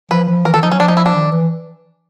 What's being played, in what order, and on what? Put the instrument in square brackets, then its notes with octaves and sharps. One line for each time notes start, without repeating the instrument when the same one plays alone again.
[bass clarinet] F3 [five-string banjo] B4
[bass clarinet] F3
[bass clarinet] E3 [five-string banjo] A#4
[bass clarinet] D#3 [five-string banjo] A4
[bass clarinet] F3 [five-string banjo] D#4
[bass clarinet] F#3 [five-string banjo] C#4
[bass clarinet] F3 [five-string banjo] D4
[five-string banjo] D#4
E4
D4
[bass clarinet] D#3
E3